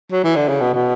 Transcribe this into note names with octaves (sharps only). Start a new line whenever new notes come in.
F#3
E3
D3
C#3
B2
B2